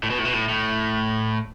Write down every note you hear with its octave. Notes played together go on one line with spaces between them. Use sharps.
A2
B2
A2
B2
A2
A2